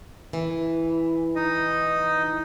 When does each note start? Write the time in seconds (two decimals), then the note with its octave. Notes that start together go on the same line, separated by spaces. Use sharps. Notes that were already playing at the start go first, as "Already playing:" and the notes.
0.33 E3
1.36 D#4 D#5